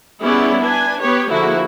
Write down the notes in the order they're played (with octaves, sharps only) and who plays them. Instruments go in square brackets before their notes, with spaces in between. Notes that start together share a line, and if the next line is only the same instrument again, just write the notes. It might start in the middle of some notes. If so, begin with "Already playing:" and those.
[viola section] G3 B3 C#4 E4 G#4 D5
D4 B4 G#5
B3 G4 B4 C#5
D3 F3 A#3 E4 F#4 G#4